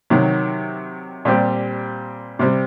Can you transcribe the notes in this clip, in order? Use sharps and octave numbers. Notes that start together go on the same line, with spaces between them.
C3 D#3 F#3
A#2 G3 C4 G4
C3 G3 C4